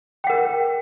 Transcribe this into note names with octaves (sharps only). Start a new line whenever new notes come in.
A#4 F#5 G5